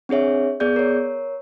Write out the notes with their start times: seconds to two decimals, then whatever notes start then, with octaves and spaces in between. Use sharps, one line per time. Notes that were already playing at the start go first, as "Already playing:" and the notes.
0.09 C4 D4 G#4 C#5 E5
0.60 B3 G#4 D5 G6
0.76 A#4 C#5